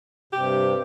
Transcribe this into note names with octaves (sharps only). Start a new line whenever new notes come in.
G2 C3 G4